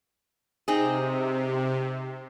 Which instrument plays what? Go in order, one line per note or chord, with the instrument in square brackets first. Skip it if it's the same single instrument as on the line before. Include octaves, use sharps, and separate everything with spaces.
[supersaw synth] C3 [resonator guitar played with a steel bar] C4 D#4 G#4